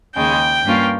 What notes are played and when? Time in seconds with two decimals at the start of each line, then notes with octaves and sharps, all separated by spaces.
0.16 D#2 C#3 G#3 G5
0.64 G2 G3 A#3 C#4 F4